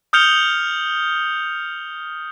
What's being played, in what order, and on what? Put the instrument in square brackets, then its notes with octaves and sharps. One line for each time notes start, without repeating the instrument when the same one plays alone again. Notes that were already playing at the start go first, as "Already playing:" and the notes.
[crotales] D#6 F6 G6 C#7 F7 G7